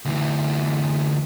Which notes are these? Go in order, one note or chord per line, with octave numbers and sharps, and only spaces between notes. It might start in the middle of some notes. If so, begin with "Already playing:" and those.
D2 E3